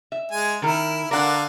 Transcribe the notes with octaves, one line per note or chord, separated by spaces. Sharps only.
E5
G#3 G#5
D#3 E4 A#4
D3 A#4 D5 F5 F#5